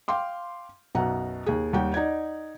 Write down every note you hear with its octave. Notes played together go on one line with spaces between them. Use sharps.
F5 G5 C6 D6
B1 F#2 B2 F#5 A#5
D#2 G#4
D#2 G3 F#5 G5
D#4 D5 F#5 G#6